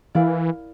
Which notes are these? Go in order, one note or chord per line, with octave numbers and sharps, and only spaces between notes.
E3 E4 A#4 D5 F5